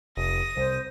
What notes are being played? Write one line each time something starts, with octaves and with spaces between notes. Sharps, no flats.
F1 D#6 A#6
C2 C5